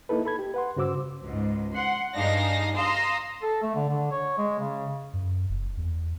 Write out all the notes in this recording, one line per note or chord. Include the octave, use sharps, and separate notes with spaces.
A#3 D#4 E4 A4 B4
A4 B5 G#6
G4
B4 F#5 C6
G2 C#3 F#4 C5 D6 E6
C#2 G#2
F#5 C6
G2 G#3 D4 D#4 F5 A#6
F5 A#5 C6 D#6 E6 A#6
A4
A3
D3
D3
C#5
G#3
C#3
F#2
F1
E2